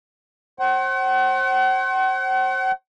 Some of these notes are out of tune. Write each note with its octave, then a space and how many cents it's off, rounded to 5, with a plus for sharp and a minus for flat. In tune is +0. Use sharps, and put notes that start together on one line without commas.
C5 +35 F#5 +40